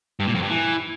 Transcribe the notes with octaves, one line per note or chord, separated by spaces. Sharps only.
G2
A#2
F2
G2
E3